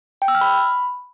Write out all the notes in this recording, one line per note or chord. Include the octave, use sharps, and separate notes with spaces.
G5
E6
F6
B5